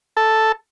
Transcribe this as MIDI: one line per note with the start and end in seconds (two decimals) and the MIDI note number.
0.17 0.52 69